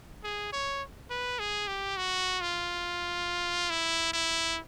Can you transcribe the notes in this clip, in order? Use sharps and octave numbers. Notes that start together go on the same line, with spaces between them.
G#4
C#5
B4
G#4
G4
F#4
F4
E4
E4